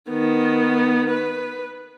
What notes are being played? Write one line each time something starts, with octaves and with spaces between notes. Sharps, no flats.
D#3 B3
B4